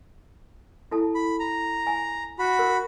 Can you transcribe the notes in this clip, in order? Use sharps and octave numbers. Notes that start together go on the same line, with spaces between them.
E4 A4 A5
B5
A#5
G#5
F#4 B5
A#4